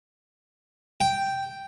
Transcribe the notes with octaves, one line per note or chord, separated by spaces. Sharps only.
G5